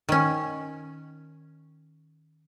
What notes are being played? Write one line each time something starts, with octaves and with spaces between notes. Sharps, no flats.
D#3 C#4